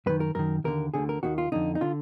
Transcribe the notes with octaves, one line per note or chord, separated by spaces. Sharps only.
F#2 D#3 B4
A#4
F#2 D#3 A#4
D#2 D3 A#4
D2 D3 G#4
A#4
D#2 D#3 F#4
F4
F2 D3 D#4
D#4
D3 F4